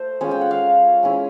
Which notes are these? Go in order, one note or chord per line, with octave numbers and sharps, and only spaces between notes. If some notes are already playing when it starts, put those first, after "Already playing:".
Already playing: A3 C5
G#3 C#4 F4 C#5
G5
F#5
F5
G#3 C#4 E4